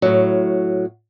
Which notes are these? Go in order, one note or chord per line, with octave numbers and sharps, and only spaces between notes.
A2 F#3